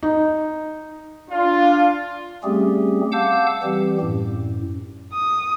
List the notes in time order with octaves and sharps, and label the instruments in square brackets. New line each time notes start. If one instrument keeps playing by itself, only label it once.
[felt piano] D#4
[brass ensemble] D4 F4
[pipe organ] G3 A3 C4 C#4 G4 G#4
F5 F#5 A5 D6 E6 G6
E3 G3 C4 G4
F#2 A2
[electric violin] D#6